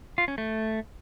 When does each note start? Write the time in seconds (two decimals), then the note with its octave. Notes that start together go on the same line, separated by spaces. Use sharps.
0.18 F4
0.28 C#4
0.38 A3